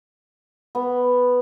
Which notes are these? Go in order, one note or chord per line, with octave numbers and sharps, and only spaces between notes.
B3